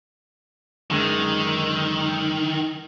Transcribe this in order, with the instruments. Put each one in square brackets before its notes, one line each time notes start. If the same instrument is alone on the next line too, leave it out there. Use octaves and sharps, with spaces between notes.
[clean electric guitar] F#2 D3 G#3 [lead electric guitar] D#3